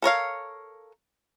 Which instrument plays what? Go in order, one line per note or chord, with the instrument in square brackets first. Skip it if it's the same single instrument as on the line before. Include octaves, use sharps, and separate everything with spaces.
[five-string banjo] A4 A#4 C#5 F5